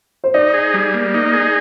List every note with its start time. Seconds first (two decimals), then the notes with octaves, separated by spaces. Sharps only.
0.24 C5
0.34 D#4 D5
0.54 G#4
0.74 G3
0.94 A#3
1.14 D#4
1.33 G#4